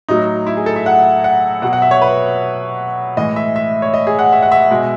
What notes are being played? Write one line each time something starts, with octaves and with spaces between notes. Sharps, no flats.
A2 F#3 D#4
E4
G#4
A4
E5
F#5
F#5
B2 F#3 F#5
F#5
E5
C#5
B4
A2 E3 G#3 D#5
E5
E5
C#5
D#5
G#4
F#5
E5
F#5
E5
B2 G#3